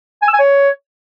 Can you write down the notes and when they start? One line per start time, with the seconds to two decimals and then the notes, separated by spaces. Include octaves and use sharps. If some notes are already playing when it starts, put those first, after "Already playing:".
0.22 G#5
0.28 E6
0.34 G#5
0.39 C#5